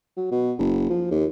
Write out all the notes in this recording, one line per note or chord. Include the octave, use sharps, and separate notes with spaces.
F#3
B2
F#1
F3
D#2